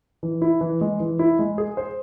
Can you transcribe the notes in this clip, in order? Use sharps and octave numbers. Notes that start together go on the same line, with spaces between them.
E3
E4
E3
G#3
E3
E4
G#3
G#4
C5